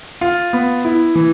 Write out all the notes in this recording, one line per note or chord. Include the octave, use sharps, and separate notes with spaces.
F4
B3
E4
E3